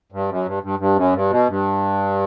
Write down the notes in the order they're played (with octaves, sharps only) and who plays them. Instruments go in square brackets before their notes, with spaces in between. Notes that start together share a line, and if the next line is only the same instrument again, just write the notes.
[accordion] G2
F#2
G2
G2
G2
F#2
G2
B2
G2